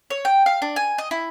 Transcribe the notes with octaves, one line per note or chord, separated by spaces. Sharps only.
C#5
G5
F5
D4
G#5
D#5
E4